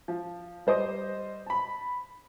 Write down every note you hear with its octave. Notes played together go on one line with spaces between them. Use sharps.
F3
G3 C5 D#5 D#6
A5 B5